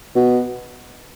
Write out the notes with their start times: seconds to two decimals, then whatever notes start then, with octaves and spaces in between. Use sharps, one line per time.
0.15 B2